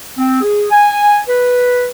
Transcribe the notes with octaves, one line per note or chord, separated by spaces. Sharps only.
C4
G#4
G#5
B4